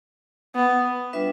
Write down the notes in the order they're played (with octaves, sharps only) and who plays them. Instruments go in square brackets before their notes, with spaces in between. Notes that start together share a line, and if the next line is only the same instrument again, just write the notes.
[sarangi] B3
[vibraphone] G3 D4 F4 B4 E5